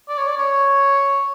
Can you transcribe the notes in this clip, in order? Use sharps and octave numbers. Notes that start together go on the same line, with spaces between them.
D5
C#5
D5
C#5